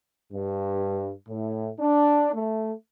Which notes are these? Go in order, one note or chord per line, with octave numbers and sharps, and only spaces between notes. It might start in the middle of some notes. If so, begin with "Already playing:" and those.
G2
A2
D4
A3